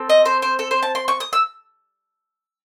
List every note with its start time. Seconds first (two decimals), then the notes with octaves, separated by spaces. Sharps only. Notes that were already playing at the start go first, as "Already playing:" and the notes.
Already playing: C4 A4
0.09 D#5
0.26 C5
0.42 C5
0.59 A4
0.71 C5
0.83 A5
0.95 C6
1.08 C#6
1.20 D#6
1.33 E6